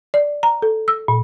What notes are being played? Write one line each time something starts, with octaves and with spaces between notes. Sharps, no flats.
D5
A#5
A4
E6
A#2